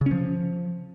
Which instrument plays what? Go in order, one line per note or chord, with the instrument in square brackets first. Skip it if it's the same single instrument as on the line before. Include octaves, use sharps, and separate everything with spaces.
[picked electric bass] C#3
C#4
F3